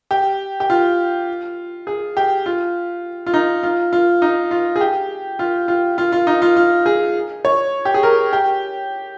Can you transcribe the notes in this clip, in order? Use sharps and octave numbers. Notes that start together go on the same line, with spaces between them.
G4
G4
F4
G#4
G4
F4
F4
D#4
F4
F4
D#4
F4
G#4
G4
F4
F4
F4
F4
D#4
F4
F4
G#4
C#5
G4
G#4
A#4
G4